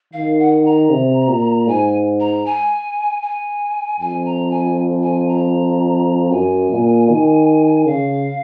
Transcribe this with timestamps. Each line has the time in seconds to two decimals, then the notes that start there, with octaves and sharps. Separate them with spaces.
0.13 D#3 F5
0.39 F#5
0.65 A#5
0.90 C3
1.28 A#2
1.67 G#2 G#5
2.20 A#5
2.46 G#5
3.22 G#5
3.99 F2 G#5
4.25 A#5
4.51 G#5
5.03 G#5
5.28 A#5
6.31 F#2 G#5
6.71 A#2
7.09 D#3
7.86 C#3 F5